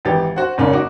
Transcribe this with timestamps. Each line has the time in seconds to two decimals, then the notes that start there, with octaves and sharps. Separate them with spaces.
0.05 G#1 E3 G4 A6
0.36 F#4 C5 F#5
0.58 F#1 G#2 A#3 C#4 D5
0.73 D#4 F#4 D6